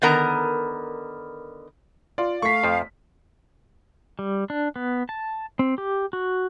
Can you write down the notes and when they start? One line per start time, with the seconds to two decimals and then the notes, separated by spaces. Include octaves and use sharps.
0.02 D3 D#3 B3 A#4 A#5
2.18 F4 D5
2.42 A3 F5 C#6 B6
2.64 F2 F3
4.19 G3
4.50 D4
4.76 B3
5.09 A5
5.59 C4
5.78 G4
6.13 F#4